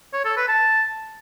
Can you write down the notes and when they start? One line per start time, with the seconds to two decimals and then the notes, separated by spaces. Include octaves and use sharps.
0.13 C#5
0.25 A4
0.37 B4
0.48 A5